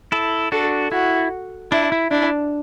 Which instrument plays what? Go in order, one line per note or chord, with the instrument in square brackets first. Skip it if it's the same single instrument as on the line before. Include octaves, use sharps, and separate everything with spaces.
[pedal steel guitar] E4 A4
[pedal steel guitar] D4 F#4 [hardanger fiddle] A4
[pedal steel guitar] E4 [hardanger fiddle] F#4
[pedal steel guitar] D4 [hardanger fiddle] E4
[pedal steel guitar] E4
[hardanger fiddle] D4 [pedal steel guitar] E4